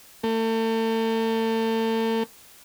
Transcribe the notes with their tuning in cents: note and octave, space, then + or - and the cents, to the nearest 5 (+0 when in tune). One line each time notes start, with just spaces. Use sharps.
A3 +40